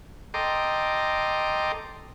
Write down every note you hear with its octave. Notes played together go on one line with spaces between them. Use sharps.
A4 D#5 G5 A#5 C6 D6